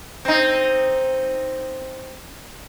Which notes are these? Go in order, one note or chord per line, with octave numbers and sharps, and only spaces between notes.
C4 D#4